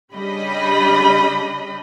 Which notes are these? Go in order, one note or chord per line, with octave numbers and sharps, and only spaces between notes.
C#3 G3 D4 D#5 B5